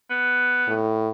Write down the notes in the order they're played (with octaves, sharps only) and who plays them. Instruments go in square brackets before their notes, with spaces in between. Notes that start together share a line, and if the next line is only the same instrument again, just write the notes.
[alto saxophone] B3
[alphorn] A2